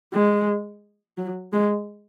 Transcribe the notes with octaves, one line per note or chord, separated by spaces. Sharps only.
G#3
F#3
G#3